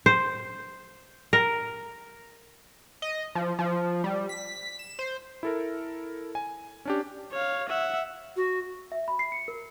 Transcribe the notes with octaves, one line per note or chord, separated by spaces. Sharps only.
C5
A#4
D#5
F3
F3
G3
B6
E7
C5
E4 A4 A#4
G#5
C#4 D4 G4
C#5 F5
E5 F#5
F#4
E5
B5
C7
C#7
A#4